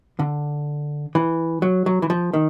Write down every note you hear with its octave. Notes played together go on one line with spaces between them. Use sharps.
D3
E3
F#3
F#3
E3
F3
D#3